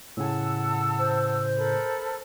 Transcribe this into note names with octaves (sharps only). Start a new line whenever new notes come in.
A2 C#3 F#5 G#5 A5 E6
C5
A4 A#4 B5